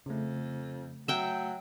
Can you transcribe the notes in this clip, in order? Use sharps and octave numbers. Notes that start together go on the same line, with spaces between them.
F2 C#3 A3
F#3 E5 G5